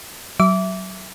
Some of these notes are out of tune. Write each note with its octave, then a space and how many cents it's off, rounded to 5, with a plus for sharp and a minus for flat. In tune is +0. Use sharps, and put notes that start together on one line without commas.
F#3 +25 E5 +0 D6 -25